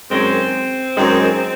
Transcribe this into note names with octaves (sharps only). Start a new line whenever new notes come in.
F#2 D#3 G#3 C4
F#2 D#3 G#3